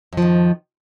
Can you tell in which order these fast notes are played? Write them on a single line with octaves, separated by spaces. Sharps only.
F2 F3 D#3